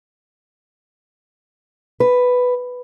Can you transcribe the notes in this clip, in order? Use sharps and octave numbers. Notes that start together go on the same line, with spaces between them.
B4